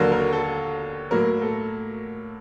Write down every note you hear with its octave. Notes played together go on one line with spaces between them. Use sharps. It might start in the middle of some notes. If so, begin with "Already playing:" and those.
Already playing: D#2 D3 F#3 A#4
A#4
A4
A2 F#3 A#3 A#4
A4